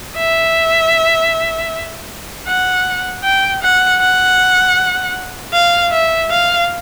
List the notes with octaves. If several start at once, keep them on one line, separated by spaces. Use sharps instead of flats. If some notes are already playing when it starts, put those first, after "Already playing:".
E5
F#5
G5
F#5
F#5
F5
E5
F5